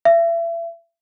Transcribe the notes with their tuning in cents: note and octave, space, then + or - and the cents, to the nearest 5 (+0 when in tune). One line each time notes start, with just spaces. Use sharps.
E5 +35